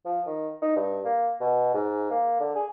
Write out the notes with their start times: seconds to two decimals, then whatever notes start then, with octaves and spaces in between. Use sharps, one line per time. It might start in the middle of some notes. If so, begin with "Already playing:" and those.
0.05 F3
0.26 D#3
0.62 D#4
0.76 G2
1.05 A#3
1.41 B2
1.74 G#2
2.11 A#3
2.40 D3
2.55 G#4